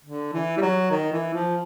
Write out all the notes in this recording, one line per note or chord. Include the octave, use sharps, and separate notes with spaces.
D3
E3
G3
F#3
D#3
E3
F3